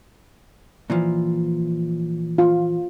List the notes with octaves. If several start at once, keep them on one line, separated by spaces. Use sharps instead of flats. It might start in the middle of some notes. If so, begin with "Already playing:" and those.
A#2 E3 F3
F4